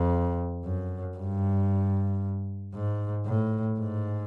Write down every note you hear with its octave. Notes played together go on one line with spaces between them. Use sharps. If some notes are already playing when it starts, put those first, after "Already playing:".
Already playing: F2
F#2
G2
G#2
A2
G#2